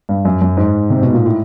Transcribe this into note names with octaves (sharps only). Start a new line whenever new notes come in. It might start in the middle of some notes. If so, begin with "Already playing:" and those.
G2
F#2
F#2
G#2
C3
B2
A#2
A2